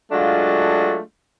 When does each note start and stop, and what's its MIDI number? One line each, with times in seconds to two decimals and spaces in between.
0.12 1.00 54
0.12 1.00 56
0.12 1.00 57
0.12 1.00 62
0.12 1.00 65